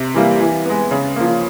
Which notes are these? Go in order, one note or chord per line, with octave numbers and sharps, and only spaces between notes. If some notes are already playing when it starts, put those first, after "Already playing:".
Already playing: C3
E3 G3 A#3
E3
G#3 B3
C#3
F3 A#3